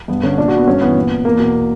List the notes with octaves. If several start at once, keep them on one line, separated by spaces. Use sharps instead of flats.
G2 B3
D3 C#4
A#2 D4
F#4
B3
G2 C#4
E3 B3
A#2
E2 A#3
B2